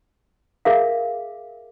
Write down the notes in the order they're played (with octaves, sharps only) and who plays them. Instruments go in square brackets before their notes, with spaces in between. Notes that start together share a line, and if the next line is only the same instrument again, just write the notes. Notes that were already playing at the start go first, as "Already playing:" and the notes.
[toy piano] G#4 A#4 E5 F5